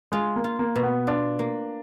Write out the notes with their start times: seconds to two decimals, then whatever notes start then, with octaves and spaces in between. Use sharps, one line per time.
0.12 G#3 F4
0.36 A#3
0.44 F4
0.59 A#3
0.76 B2
0.83 B3
1.07 D4 F4
1.39 A#3